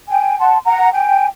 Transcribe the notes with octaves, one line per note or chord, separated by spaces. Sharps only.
G5 G#5
F#5 A5 C6
F#5 A#5
G5 G#5